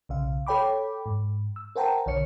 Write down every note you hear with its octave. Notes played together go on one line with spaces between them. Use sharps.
B1 C#3 F5
A4 C#5 G5 B5 D6
G#2
E6
A#4 C5 F#5 G5 A5 A#5
B1 D3 C#5 C#7